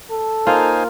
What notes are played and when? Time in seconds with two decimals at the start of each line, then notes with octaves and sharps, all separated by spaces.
0.10 A4
0.47 A#3 D#4 F4 C5 G#5